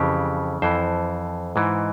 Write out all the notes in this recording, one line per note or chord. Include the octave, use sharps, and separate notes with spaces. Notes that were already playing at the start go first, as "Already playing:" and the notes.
Already playing: F2 C#3 E3 G4
F2 E3 C5
G#2 E3